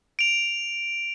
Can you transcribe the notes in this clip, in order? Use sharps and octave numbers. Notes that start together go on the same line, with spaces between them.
D7 F7